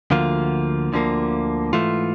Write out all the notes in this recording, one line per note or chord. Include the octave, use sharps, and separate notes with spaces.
D2 D3 F3 A#3 F4
D2 D3 F3 A#3
G#2 E3 A3 F4